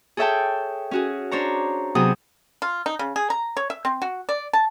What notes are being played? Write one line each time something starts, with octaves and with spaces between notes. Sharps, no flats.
G#4 A4 C#5 E5 G5 A5
C#4 F#4 G#4
D4 C5 C#5 A#5
C3 F#3 B3 G#4 C5 D#6
F4
D#4
C#3
G#4
A#5
C#5
E5
C4
F#4
D5
A5